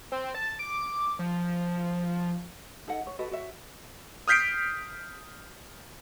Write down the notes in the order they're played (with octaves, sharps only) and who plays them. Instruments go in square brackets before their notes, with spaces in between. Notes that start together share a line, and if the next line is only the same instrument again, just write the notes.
[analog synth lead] C4
A5
D6
F3
[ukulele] D#4 A4 D#5 F#5
C#5
F#4 A4 B4 D#5
F#4 C#5 E5
[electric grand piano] D#6 F6 G6 B6 C7 D7